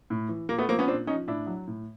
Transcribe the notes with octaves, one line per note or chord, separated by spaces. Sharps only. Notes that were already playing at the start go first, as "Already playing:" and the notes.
A2
E3
A#2 A#3
A3 B3
F3 A#3 C4
B3 C#4
A#2 C4 D4
F3 C#4 D#4
A2 D4 E4
F#3
A2